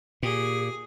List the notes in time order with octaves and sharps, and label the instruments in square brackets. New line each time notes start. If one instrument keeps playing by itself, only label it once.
[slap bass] A#2 [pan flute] G4 [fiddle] G#4